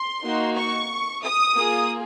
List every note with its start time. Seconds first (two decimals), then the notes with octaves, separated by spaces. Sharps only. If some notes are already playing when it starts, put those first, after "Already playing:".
Already playing: C6
0.22 A#3 D#4 F#4
0.56 C#6
1.24 D#6
1.56 A#3 F4 G#4